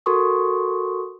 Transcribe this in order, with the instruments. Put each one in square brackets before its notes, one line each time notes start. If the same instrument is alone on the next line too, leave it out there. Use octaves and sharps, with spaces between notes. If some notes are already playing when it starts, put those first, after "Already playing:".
[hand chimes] F#4 A4 A#4 C6 C#6 D#6